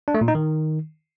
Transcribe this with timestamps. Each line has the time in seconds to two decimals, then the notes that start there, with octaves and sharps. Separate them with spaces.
0.08 D4
0.14 A3
0.21 A#2
0.28 D#4
0.35 D#3